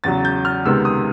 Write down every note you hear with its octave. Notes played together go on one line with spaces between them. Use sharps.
E2 C#3 F#3 A6
G6
F6
C#2 C3 D#3 G#3 B3 E6
D#6